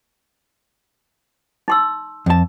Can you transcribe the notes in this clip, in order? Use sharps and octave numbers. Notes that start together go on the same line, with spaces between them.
D#4 C6 E6
F2 A5